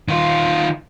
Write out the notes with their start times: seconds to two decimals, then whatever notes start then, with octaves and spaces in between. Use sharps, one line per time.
0.08 D#3 F4